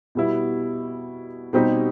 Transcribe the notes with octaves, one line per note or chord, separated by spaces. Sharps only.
B2 G3 B3 E4
B2 G3 C4 D#4 G4